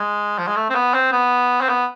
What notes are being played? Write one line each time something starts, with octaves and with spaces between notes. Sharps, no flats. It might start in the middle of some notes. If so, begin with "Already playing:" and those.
Already playing: G#3
F3
G#3
A3
C4
B3
C4
B3
C4
B3